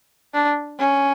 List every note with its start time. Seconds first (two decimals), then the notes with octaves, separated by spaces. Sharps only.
0.34 D4
0.79 C#4